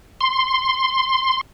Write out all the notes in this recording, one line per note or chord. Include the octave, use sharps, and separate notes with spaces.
C6